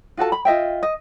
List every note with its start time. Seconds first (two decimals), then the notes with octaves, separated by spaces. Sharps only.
0.17 F4 F#4 A4 A5
0.32 B5
0.45 F4 D#5 E5 G5
0.83 D#5